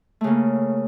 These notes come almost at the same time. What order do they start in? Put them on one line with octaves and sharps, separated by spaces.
A3 C#3 A#3